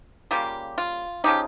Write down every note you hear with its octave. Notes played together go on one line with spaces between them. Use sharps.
C#3 G3 A#3 F4 G4
F4
C#3 F3 A#3 D#4 G4